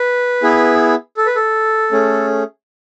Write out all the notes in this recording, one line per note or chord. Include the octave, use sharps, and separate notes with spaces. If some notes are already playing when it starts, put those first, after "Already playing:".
Already playing: B4
B3 E4 G#4
A4
B4
A4
A3 C#4 G#4